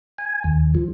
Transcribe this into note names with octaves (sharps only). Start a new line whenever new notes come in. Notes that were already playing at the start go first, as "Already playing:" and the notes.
G#5
D#2
F3